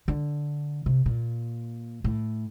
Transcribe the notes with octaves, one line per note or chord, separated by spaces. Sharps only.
D3
C3
A#2
A2